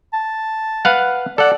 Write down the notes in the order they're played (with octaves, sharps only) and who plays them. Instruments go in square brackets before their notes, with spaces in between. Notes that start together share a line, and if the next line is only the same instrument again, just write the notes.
[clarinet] A5
[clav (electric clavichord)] B4 F5 F#5
[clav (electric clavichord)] A4 F#5 [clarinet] D5